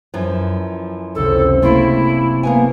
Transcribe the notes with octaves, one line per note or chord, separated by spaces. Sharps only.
F#2 E3 F3
F#1 C#2 C3 A4
A3 A#3 E4 C6
A#3 B3 G#5